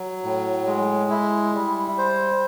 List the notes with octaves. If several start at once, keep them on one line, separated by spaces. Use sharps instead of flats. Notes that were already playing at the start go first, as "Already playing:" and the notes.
Already playing: F#3
A2
G#3
E4
G3
C5